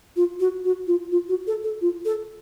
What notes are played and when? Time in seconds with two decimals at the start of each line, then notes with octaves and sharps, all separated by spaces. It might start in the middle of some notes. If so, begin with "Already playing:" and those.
0.16 F4
0.40 F#4
0.65 F#4
0.87 F4
1.12 F4
1.29 F#4
1.47 A4
1.64 A4
1.81 F4
2.05 A4